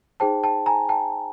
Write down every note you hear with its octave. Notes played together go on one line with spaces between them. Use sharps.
D#4 G#4 C5 G5 A5
G5 A5
G#5 A#5
G5 A5